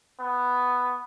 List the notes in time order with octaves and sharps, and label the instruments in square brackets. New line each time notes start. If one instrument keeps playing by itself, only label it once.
[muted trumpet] B3